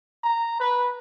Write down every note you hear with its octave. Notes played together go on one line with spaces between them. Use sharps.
A#5
B4